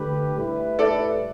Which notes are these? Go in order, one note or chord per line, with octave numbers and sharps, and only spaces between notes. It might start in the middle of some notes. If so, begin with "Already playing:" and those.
Already playing: D3 A3 G4 B4
A2 G3 E4 B4
A4 D5